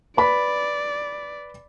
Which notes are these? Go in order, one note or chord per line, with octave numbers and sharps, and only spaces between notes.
B4 D5 B5